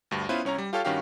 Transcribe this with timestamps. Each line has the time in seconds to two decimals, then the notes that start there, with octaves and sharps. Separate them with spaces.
0.11 D2 G2
0.29 B3 C#4 E4 F4 B4 C5
0.45 C2 C#4 C#5 A#5
0.58 G3
0.73 F4 G4 A4 C#5 F5
0.85 G2 D#3 C#4 F#4 G4 F5